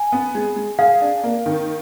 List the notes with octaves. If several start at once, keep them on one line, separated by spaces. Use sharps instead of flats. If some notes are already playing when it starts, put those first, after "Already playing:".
Already playing: G#5
B3
G#3
G#3
G#4 F5
D4
A#3
D#3